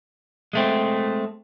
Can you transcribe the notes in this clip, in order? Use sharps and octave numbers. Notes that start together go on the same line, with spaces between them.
G#3 A3 C4